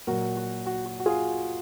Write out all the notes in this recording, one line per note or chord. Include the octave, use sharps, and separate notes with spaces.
A#2 F#3 F#4 A#4
F#4
F#4
F#4
F#4
F4 G#4